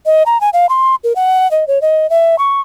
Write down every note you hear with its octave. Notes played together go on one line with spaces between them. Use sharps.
D#5
A#5
G#5
F5
C6
A#4
F#5
D#5
C#5
D#5
E5
C#6